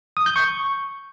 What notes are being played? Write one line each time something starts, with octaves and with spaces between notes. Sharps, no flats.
D#6
G6
C#6